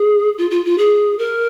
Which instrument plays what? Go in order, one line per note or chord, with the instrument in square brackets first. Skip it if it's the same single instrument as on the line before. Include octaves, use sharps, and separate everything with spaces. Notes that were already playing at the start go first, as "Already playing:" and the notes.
Already playing: [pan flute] G#4
F4
F4
F4
G#4
A#4